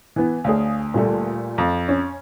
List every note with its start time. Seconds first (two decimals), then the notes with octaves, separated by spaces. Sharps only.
0.16 E3 B3
0.44 D2 G#4 C#5 F5
0.94 A#2 G3 A3
1.58 F2
1.88 C#4